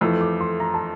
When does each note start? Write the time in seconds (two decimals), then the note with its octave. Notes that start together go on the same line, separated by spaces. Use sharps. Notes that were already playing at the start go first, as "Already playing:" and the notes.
0.01 F2 E3 A3 E6
0.21 D6
0.41 C6
0.60 A#5
0.74 A5